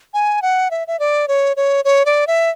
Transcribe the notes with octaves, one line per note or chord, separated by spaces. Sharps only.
G#5
F#5
E5
E5
D5
C#5
C#5
C#5
D5
E5